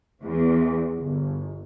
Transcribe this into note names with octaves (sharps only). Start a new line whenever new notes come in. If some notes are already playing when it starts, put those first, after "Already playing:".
E2
G1